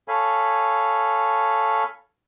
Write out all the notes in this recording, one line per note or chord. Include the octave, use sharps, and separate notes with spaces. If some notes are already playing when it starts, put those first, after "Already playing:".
A4 C#5 F5 G#5 B5